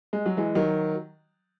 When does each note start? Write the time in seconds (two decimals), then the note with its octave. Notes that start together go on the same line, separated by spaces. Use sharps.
0.13 G#3
0.26 F#3
0.37 E3 G#3
0.55 D#3 F#3